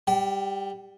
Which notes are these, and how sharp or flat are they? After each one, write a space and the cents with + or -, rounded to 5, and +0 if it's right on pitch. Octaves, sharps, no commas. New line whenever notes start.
G3 +10 G5 -35